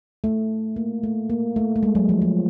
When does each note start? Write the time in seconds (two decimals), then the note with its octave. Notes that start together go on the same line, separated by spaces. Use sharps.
0.24 A3
0.76 A#3
1.03 A3
1.30 A#3
1.56 A3
1.76 A3
1.83 G#3
1.95 F#3
2.09 F3
2.22 F3